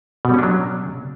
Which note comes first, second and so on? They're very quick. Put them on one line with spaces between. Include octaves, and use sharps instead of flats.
B2 G3 C#4 D4 F#3